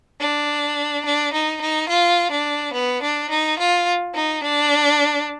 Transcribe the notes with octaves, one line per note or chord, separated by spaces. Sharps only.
D4
D4
D#4
D#4
F4
D4
B3
D4
D#4
F4
D#4
D4